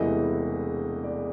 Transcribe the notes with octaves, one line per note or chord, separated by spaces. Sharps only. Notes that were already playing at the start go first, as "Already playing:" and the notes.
Already playing: E1 E2 C3 E3 A3 D#5
D5